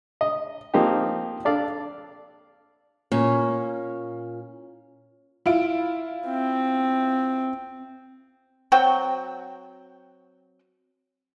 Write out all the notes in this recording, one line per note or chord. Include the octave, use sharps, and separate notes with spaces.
D#5
F3 A#3 C4 D#4 G4
D4 A4 D5 F5
A#2 C#4
E4 F4 D7
C4
F#3 C4 F#4 G5